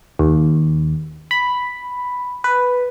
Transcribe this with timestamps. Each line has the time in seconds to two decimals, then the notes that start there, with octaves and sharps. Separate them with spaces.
0.19 D#2
1.31 B5
2.44 B4